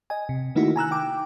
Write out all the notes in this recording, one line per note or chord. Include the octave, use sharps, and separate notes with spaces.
D#5 G#5
C3
D#3 A3 A#3 D#4 E4 F#4
G#5 A#5 E6 F#6
G5 D6